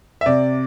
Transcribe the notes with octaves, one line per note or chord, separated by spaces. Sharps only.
E5
C3 D5